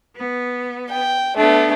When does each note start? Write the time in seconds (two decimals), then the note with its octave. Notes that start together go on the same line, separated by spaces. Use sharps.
0.16 B3
0.90 G5
1.36 A3 B3 D4